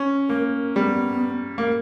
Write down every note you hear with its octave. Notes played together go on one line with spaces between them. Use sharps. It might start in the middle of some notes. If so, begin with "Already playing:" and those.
Already playing: C#4
A#3 A#4
G3 B3
A#3